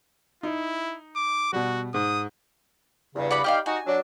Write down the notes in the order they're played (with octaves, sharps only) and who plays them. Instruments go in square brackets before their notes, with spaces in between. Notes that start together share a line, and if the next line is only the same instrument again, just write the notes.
[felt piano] D#4 [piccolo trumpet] E4
[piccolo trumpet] D6
[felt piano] B2 G3 [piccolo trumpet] F#4
[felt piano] G#2 [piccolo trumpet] D#6
[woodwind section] E2 G2 C#3
[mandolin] F#4 D5 B5
[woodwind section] D#4 G5 F6 [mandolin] G4 D5 F5
[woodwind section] D#4 F#4 [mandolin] G#5
[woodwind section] F#3 D4